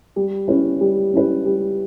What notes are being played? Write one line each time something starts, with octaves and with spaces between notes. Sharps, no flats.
G3
C#4 E4 B4
G3
C#4 E4 B4
G3